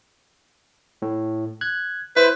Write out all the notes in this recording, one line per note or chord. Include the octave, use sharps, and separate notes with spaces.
A2
F#6 G#6
E4 B4 C5